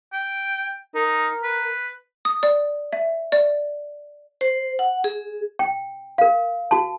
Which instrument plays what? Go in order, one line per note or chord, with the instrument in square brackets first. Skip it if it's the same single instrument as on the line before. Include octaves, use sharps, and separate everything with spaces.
[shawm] G5
[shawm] D#4 [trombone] A#4
[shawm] B4
[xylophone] D#6
D5
E5
D5
[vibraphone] C5
F#5
G#4
[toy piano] G5
A#4 F5
F#4 A5